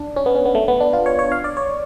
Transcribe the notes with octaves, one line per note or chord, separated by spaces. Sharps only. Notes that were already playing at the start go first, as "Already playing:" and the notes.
Already playing: D4
C#4
B3
C#4
B3
A3
B3
D4
F4
C#5
C#5
F5
D5
C#5